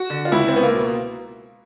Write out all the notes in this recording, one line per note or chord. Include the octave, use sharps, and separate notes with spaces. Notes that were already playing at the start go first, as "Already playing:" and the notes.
Already playing: F#4
D3
F4
C#2 E4
C4
C#2 B3
A#3
B2